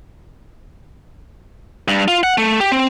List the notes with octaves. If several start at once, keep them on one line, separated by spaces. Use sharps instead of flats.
G2
F4
F#5
A3
G4
C4